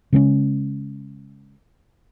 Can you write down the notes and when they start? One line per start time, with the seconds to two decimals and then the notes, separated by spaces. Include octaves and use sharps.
0.12 C#3 G#3 B3 C#4